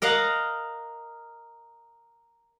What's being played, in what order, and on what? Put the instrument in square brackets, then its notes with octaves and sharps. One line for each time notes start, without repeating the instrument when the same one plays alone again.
[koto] A#4 D#5 F5 F#5